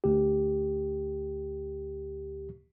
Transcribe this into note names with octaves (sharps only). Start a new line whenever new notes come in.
D2 G4